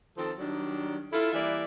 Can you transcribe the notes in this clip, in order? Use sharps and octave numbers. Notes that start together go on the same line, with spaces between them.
D#3 F3 C4 A4
D#3 F#3 G3 D4
E4 F4 A4
E3 G3 A#3 B4 D5 E5